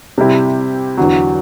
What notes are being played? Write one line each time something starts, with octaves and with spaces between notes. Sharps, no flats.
C3 G3 C4 E4 G4
E2 D3 F#3